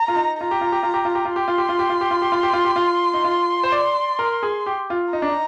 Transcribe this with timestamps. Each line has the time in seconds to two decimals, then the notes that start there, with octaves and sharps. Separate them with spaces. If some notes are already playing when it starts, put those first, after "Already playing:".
Already playing: A#5
0.08 F4
0.16 D#4
0.40 F4 A#5
0.51 G4
0.61 F4
0.72 G4
0.83 F4
0.94 G4
1.05 F4
1.15 G4
1.25 F4
1.35 G4 C6
1.48 F4
1.58 G4
1.69 F4
1.79 G4
1.89 F4
2.01 G4
2.11 F4
2.22 G4
2.32 F4
2.43 G4
2.53 F4
2.65 G4
2.76 F4
3.14 D#4
3.24 F4
3.63 C5
3.72 D5
4.19 A#4
4.43 G#4
4.66 G4
4.90 F4
5.13 D#4 A#5
5.22 D4
5.30 D#4